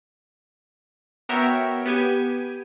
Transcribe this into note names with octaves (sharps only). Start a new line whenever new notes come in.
B3 F#4 A#4 C#5 E5 G5
B3 G4 G#5